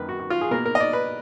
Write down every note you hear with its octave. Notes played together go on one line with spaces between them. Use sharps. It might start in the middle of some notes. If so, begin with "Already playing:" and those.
Already playing: F#2 D#3 A#3 B4
F#4
F#4
F4
G#4
B2 A#3 A#4
A#4
D#5
D5
B4